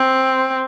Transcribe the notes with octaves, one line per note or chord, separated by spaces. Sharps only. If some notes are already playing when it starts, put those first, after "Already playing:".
Already playing: C4